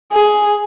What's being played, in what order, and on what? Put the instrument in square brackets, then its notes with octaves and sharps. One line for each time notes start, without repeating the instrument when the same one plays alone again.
[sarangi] G#4